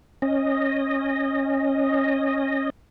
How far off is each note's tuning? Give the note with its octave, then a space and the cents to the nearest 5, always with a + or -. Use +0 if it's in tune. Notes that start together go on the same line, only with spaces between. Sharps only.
C#4 -20 D#5 -10